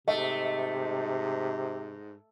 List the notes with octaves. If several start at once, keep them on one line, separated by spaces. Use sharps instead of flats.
G#2 C3 A3 D#5